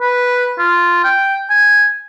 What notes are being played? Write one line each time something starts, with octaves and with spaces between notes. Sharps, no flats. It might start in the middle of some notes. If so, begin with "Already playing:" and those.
B4
F4
G5
G#5